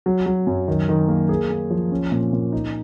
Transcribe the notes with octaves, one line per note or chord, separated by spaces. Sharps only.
F#3
F#3
F#2
D#3
D#3
A#3
G#4
A#3
F3
C#4
A#2
A#2
D#4